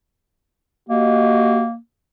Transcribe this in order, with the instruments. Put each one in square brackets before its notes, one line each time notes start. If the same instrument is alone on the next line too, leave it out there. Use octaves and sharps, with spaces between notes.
[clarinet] A#3 [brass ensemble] F#4 G4 D#5